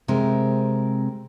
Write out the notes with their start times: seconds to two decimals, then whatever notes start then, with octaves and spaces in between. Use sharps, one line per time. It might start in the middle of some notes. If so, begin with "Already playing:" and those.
0.08 C3 G#3 C4 G4 A#4